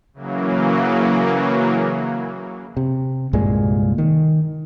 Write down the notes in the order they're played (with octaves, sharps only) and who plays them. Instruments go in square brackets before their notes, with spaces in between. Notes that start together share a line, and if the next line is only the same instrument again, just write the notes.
[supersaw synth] C#3 E3 F#3 A#3
[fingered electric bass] C3
C2 G2 A#2 G#3
D#3